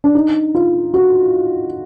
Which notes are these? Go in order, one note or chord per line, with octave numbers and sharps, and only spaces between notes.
D4
D#4
F4
F#4